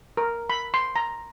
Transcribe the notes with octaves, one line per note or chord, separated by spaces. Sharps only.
A#4
B5
C6
A#5